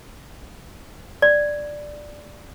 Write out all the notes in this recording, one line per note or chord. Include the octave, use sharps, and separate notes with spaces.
D5